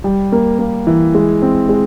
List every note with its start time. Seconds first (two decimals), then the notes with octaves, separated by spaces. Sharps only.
0.04 G3
0.32 A#3
0.59 A#3
0.87 E3
1.15 G#3
1.42 C4
1.69 G#3